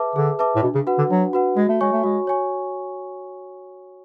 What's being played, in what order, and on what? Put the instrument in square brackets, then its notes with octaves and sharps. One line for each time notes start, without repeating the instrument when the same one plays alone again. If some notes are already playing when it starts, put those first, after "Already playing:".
Already playing: [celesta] G#4 B4 E5 A5 D6
[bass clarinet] D3 [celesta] G#4
[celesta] B4 E5 A5 D6
[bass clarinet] A2
[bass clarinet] B2 [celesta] D4
[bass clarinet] C#3
[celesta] F#4 B4 F#5
[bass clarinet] D3
[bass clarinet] F#3 [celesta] D4
[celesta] F#4 B4 F#5
[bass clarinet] G#3 [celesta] F#4
[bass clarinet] A3
[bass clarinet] G#3 [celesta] C#5 G#5 C#6
[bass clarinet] A3
[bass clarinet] G#3 [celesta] F#4
[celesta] C#5 G#5 C#6